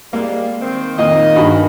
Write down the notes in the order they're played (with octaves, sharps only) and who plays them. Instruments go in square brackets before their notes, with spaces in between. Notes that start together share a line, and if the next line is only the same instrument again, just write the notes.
[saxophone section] G3 G#3 [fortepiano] A#3
[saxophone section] D#3 C4
[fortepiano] F2 A#2 A#3 [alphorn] D#3 [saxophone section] D#5
[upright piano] G2 [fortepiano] F#4 G#4 B5